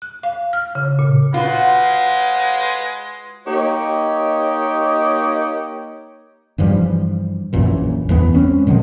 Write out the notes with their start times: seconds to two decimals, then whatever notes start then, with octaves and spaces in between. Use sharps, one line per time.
0.02 F#6
0.23 F5
0.53 F6
0.75 C#3
0.99 A#2
1.34 G#3 F4 F#4 B4 F5 F#5 C6
3.47 A#3 D#4 G4 C#5 D#5
6.58 G2 E3 F3 G3
7.53 A#1 F#2 A#2 E3
8.09 E2 E3 B3
8.35 G#3 C4 C#4
8.67 A#2 D3 F3 G#3